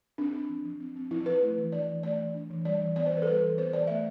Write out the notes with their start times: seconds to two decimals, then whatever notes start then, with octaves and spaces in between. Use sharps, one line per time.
0.18 C4 D4
0.34 C4
0.50 F3
0.65 F3
0.80 C4
0.96 C4
1.11 F3 E4
1.26 F3 B4
1.42 A3
1.58 E3
1.72 D4 D5
1.89 E3
2.03 A3 D5
2.19 E3
2.34 D4
2.50 E3
2.65 G3 D5
2.81 E3
2.96 B3 D5
3.06 C5
3.12 E3 B4
3.22 A4
3.27 G3 B4
3.42 E3
3.58 B3 C5
3.73 E3 D5
3.87 A3 E5